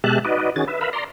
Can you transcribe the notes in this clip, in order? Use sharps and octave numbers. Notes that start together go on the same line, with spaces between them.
B2 G#3 G4 E5 A5 F#6
D#4 F#4 B4 D5 D#5
D#3 C#4 F#4 G#4 A6
B4 E5
A#4 B4 E5 F5 B5
D5 A#5 C6